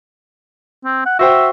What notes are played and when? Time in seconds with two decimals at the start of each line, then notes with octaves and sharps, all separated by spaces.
0.85 C4
1.06 F#5
1.19 F#4 C5 E5 G5